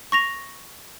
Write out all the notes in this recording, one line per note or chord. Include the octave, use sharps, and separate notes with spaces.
C#6 A#6 F7